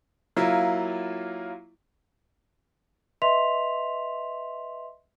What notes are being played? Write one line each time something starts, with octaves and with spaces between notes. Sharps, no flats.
F#3 A#3 E4 F4
B4 D#5 E5 C6 B6 F7